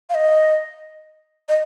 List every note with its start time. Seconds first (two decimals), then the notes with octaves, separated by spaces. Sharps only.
0.09 F5
0.14 D#5
1.49 D#5